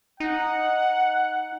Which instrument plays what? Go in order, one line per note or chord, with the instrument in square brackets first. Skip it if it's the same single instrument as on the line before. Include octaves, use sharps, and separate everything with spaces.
[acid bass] D#4 [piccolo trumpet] F#5